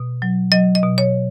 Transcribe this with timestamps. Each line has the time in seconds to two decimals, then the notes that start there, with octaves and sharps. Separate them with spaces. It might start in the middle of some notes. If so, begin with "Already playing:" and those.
Already playing: B2
0.22 F#3
0.52 F#3 D#5
0.75 D#5
0.83 B2
0.98 C#5